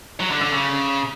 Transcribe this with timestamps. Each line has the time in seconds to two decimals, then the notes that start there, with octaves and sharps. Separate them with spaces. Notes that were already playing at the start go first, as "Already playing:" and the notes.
0.20 F#3
0.31 D3
0.41 D3
0.52 C#3